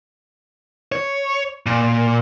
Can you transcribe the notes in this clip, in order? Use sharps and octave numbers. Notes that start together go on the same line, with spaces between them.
C#5
A#2